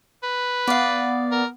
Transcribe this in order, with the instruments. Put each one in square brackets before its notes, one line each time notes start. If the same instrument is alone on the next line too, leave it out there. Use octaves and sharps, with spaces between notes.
[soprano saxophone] B4
[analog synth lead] B3 [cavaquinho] D5 F5
[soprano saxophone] A#4